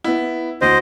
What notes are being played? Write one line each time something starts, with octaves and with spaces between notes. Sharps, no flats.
B3 E4
D2 C5 D#5